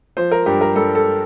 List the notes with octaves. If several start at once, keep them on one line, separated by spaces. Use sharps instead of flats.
F3 C5
A#4
G2 G4
A#4
G2 A4
A4